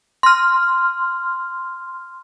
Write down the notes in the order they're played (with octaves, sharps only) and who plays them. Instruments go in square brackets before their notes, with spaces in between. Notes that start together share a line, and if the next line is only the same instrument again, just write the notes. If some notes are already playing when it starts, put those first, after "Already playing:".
[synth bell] C6 F6